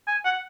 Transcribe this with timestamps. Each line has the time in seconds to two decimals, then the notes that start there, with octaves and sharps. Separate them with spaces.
0.08 G#5
0.25 F#5